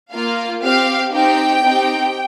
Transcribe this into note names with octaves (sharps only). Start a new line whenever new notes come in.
A#3 F4 F5
C4 G4 F5
C4 D#4 G4 G5
C4 D#4 G4